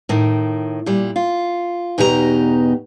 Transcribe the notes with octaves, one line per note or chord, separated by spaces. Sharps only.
A2 D#3
A#2 G3
F4
E2 B2 D#4 G4 A4 A#5